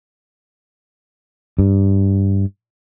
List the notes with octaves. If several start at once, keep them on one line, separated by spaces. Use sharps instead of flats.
G2